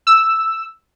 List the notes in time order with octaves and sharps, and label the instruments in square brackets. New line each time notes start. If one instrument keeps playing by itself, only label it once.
[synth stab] E6